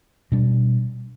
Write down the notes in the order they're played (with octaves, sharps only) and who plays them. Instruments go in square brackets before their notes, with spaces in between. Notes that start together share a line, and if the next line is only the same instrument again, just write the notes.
[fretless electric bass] B2 G3 D4